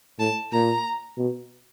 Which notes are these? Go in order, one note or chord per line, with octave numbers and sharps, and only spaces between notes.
A2 A5
A#2 A#5
B2